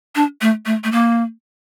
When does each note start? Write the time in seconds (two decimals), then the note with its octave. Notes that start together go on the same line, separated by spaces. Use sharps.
0.15 D4
0.41 A3
0.66 A3
0.84 A3
0.92 A#3